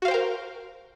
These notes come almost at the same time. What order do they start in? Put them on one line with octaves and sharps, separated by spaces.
F#4 F5 C5 G5 A#4